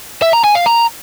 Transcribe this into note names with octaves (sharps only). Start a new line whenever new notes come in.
E5
A#5
G#5
F5
A#5